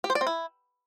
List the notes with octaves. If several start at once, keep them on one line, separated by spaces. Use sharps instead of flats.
G4
C5
D5
C4
E4